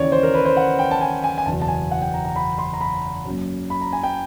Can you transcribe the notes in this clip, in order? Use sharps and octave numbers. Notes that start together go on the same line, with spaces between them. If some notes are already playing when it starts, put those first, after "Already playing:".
Already playing: D#2 C#3 E3 C#5 D5
C5
A#4
B4
C5
F#5
G5
A5
G#5
G#5
G#5
F#1 E2 B2 A5
A5
G#5
F#5
G5
A#5
A#5
B5
C6
A#5
B5
F#2 C#3 F#3 A#3
B5
A#5
G#5
G5